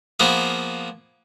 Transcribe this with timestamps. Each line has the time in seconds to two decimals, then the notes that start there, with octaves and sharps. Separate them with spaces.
0.20 F3 A#3 B3 G#4